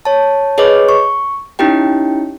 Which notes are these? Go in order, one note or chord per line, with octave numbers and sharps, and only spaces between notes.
C#5 A5
G#4 B4 C#5 D#5 D6
C#6
C#4 D#4 E4 G4 G5